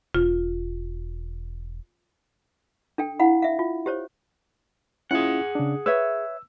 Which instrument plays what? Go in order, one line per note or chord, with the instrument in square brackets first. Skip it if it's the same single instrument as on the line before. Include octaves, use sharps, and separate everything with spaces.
[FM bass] E1 [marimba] F4
[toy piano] D4 A4 G5
E4 F5 F#5 B5
E5 F5
F4
G4 C5 C#5
[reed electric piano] C#4 E4 F4 [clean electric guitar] G#4 F#5
[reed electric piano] C#3 D4
[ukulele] B4 C#5 E5 [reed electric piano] E6